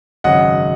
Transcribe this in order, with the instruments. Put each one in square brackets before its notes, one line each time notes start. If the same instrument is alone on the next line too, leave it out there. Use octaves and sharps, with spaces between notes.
[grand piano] G#1 F#2 C#3 D#5 F#5